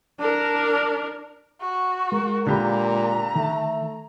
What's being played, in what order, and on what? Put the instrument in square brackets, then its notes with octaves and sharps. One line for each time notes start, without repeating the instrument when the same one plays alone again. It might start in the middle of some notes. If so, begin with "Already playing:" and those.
[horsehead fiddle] D4 A#4
[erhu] F#4
[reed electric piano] G#3 [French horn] A#4
[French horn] A#2 [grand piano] D3 G4 B5 [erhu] A#5
[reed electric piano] D#3 [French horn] A3